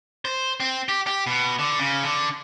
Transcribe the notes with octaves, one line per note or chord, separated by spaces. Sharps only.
C5
C4
G4
G4
B2
D3
C#3
D3